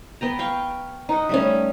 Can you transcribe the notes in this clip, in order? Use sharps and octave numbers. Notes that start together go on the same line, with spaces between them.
B3 G5 A#5
F5 G5 C#6
D#4 F#5
G3 A3 C#4